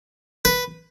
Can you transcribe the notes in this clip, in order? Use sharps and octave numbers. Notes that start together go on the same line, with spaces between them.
B4